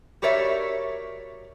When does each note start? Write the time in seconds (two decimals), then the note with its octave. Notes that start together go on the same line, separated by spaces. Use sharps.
0.22 F#4 G4 A#4 C#5 D5 E5